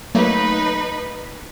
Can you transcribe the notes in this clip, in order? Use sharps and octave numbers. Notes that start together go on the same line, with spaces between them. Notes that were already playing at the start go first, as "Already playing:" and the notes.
F#3 A3 A#3 D#4 B4